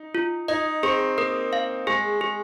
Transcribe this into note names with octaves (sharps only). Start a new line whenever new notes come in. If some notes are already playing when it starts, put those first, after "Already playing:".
Already playing: D#4
F4
D#4 D#5
C4 G#4
A#3 A#4
F5
G#3 G#4
G#4